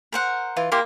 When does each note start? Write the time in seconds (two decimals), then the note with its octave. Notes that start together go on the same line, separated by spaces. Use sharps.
0.12 A#4 C5 F#5
0.57 E3 F4
0.72 A#3 E4 G4 C6